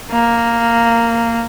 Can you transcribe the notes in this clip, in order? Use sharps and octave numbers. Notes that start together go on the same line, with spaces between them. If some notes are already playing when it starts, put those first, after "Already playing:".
A#3